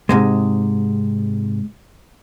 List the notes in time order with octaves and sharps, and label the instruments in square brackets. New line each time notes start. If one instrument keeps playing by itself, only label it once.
[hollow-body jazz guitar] G#2 C3 G#3